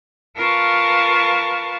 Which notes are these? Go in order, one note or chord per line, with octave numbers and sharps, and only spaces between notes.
F4 A#4 B4 F5 A5 C#6